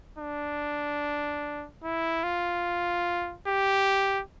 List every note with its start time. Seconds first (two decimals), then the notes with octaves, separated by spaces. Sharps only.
0.19 D4
1.84 E4
2.24 F4
3.47 G4